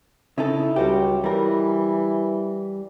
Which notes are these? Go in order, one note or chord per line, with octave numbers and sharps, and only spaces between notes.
C#3 D#4 E4 A4
C#2 G3 F#4 G4
E3 G3 A#4